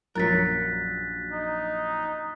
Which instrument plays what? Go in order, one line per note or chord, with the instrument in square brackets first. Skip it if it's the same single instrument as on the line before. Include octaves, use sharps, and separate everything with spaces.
[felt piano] A#1 F#2 [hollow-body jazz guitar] F#3 A#4 [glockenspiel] F#6 A6 B6
[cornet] D#4